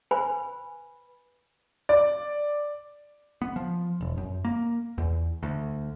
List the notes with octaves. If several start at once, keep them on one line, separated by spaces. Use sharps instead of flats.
B4 C5 G#5 B5
D5
B3
F3
E1
F#2
A#3
E2
D2